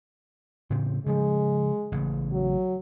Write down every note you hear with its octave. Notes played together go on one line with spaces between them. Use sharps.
A2 C#3 C4
C#3 F3 G#3
A1 C#3
F#3